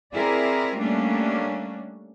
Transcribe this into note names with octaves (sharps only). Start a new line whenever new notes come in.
C4 E4 G#4 A#4 D5
G3 A3 A#3 C#4 D4